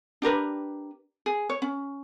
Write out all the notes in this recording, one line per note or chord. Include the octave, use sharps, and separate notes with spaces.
D4 G4 A#4 B4
G#4
C#5
C#4